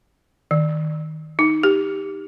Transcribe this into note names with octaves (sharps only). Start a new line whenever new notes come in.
D#3
D#4
G4